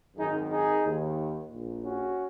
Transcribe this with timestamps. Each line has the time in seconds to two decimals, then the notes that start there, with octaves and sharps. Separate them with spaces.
0.16 G#1 F#2 D#3 D#4 G#4
0.50 D#4 G#4
0.83 D#2 D#3
1.49 A#1 A#2
1.83 C#4 F#4